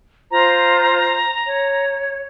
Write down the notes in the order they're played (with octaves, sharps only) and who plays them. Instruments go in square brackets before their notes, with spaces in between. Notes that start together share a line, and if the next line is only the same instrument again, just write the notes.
[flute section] F4 C5 [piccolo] A#5
[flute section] C#5